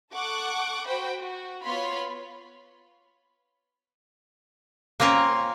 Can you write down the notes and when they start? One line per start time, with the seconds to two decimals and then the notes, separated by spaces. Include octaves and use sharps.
0.13 A4 F#5 C#6 D6
0.88 F#4 C5 G5 B5
1.19 F#4
1.63 B3 F4 C#5 B5 C6
5.00 A#3 C4 C#4 F4 A#4